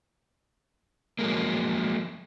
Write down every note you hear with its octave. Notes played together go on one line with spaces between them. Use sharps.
F3 F#3 G#3 A#3